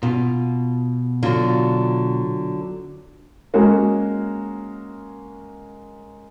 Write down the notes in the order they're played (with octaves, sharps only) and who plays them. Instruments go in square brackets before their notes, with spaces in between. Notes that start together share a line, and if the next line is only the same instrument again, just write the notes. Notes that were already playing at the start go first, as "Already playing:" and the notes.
[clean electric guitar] B2 [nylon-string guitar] F4
[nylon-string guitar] D3 F#3 F4
[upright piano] G#3 A#3 C#4 F#4 A#4